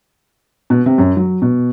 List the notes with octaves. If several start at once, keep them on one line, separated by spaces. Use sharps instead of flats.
B2
C3
F#2
F#3
B2